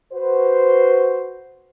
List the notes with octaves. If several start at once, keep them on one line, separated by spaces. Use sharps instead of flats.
F#4 B4 C5